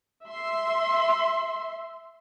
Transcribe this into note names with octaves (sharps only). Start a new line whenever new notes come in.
E5 C6